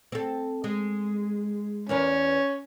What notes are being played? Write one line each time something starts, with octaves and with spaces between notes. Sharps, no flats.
C4 A4
G#3
E2 C#4 A#4 B4